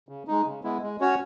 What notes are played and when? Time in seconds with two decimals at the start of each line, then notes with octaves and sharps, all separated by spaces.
0.08 C#3
0.27 G#3 D#4
0.46 C#3
0.63 G#3 B3 E4
0.82 G#3
1.00 C#4 F#4 C#5